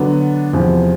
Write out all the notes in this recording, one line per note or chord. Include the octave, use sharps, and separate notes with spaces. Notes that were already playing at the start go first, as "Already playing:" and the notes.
Already playing: D3 F#3 B3 D4
E2 C3 F3